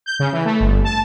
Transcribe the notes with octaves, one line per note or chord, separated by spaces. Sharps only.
G6
C#3
E3
A3
G1
A5